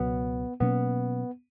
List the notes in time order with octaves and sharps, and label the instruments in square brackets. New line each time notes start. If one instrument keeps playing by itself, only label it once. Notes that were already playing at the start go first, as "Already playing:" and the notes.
Already playing: [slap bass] C#2 B2 F#3 [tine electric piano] B3
[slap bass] B2 F#3 A#3 C#4 [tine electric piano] B3